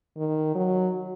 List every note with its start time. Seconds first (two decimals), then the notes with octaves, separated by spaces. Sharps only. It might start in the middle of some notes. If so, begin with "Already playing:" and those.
0.17 D#3
0.55 F#3